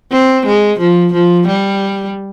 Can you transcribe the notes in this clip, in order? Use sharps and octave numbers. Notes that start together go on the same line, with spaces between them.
C4
G#3
F3
F3
G3